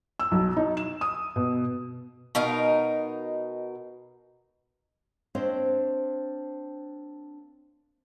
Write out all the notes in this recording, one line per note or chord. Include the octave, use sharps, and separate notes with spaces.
E6
B1
D#4
E7
D#6
B2
B2 D#4 A#4 F5
A#3 C4 D4 C5 C#5 D#5